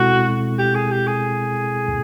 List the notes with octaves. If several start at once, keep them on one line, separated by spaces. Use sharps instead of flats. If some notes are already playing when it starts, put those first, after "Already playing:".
Already playing: B2 G#3 C4 E4 F#4 A4
G4
G#4
G4
G#4